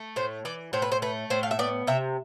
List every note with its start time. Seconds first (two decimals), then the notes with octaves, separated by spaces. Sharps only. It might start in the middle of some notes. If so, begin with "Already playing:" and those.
Already playing: A3
0.16 A2 C5
0.45 E3 D5
0.73 A2 C5
0.82 B4
0.92 C5
1.02 A3 B4
1.30 A2 C5
1.43 F5
1.51 E5
1.59 B3 D5
1.87 C3 E5